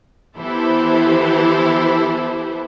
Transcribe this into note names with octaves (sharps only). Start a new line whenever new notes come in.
E3 B3 E4 G4 A4 C5